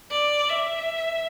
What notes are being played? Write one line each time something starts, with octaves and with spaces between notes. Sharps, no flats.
D5
E5